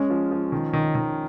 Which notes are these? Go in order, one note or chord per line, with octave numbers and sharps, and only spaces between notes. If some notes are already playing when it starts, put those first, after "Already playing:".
Already playing: G#3 C#4
F3
F3
D#3
D#3
D#3